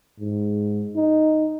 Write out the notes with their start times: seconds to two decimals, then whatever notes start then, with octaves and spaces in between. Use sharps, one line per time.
0.20 G#2
0.96 D#4